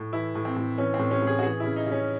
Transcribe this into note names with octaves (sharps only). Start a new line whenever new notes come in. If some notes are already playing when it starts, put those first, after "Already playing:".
Already playing: A2
E3 E4
A2
C4
A2
E3 C#4
C4
A2
C#4
A2 G#4
F#4
E3 G#4
C#3 E4
D#4
C#3
C#4